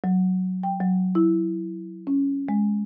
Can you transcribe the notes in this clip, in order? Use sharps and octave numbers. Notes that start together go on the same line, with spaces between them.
F#3
G5
F#3
E4
C#4
G#3